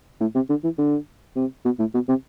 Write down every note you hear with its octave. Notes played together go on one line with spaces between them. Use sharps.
A2
C3
D3
E3
D3
C3
B2
A2
B2
C3